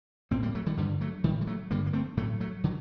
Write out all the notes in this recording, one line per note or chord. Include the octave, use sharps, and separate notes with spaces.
A2 A3 C4
G3 A#3
F#3 A3
D#3 G3
G2 D3 D#3 G3
F#3 A3
A2 D#3 G3
G3
F#3 A3
G2 D3 G3 A#3
A#3
A3 C4
A2 F#3 A3
F#3 A3
D3 F#3